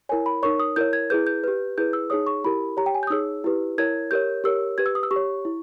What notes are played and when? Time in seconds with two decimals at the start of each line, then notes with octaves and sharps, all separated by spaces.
0.09 E4 A#4 C#5 G#5
0.26 B5
0.43 D#4 A#4 C#5 C#6
0.60 D#6
0.76 E4 A#4 C#5 G6
0.93 G#6
1.10 E4 G#4 B4 G6
1.27 G6
1.44 G4 B4
1.78 E4 G#4 B4 G6
1.93 E6
2.10 D#4 G#4 C#5 D#6
2.27 C#6
2.44 E4 G4 A#4 B5
2.77 G4 C#5 A#5
2.86 G5
2.95 G#5
3.03 G6
3.07 D#6
3.10 D#4 G#4 C#5 E6
3.44 E4 G4 B4
3.78 E4 A#4 C#5 G#6
4.11 G4 A#4 C#5 G6
4.44 G4 A#4 C#5 E6
4.78 G4 B4 G#6
4.86 E6
4.95 D#6
5.03 E6
5.11 G4 C#6
5.16 C#5
5.45 E4